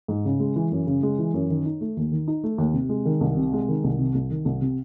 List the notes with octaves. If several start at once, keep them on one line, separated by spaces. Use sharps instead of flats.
G#2
C#3
G#3
E3
F#2
C#3
G#3
E3
F#2
D#3
D#4
A3
D#2
D#3
D#4
A3
D#2
C3
G#3
D#3
C2
C3
G#3
D#3
C2
C3
C2
D#3
C2
C3